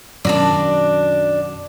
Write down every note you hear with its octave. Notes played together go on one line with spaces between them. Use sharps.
F#2 B2 D#3 D4 F#4 D5